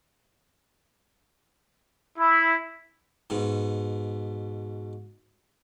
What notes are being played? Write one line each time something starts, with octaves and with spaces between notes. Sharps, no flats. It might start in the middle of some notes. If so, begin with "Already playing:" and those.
E4
G#2 B2